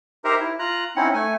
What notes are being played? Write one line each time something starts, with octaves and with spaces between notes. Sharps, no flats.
D#4 G4 A#4 C5 E5 A#5
E4
F4 A#5 F#6
C4 C#4 D#4 E4 F#5
A3 G#5